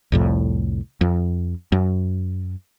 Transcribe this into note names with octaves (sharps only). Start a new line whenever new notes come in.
C2 F2 A2
F2
F#2